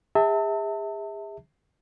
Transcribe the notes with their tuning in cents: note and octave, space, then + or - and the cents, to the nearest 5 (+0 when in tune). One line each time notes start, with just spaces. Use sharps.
G#4 -35 E5 -25 A5 +35